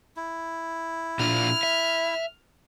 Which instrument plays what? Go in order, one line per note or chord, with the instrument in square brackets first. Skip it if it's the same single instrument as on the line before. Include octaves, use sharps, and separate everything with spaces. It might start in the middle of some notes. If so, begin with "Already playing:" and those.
[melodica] E4
[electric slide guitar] A#2 D4 F4 [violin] F6
[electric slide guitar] E5